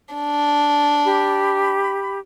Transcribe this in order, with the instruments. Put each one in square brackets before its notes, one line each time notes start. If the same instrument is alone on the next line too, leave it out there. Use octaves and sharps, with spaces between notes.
[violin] D4
[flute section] G4 B5